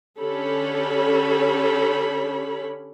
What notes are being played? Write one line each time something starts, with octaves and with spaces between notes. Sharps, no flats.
D3 C#4 G4 A4 C#5 B5